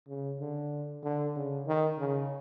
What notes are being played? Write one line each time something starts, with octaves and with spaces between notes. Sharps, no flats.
C#3
D3
D3
C#3
D#3
C#3